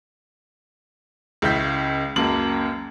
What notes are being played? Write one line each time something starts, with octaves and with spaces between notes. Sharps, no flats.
C#2 C#3 E4 G6 B6
C#2 F#2 A#3 A5 F#7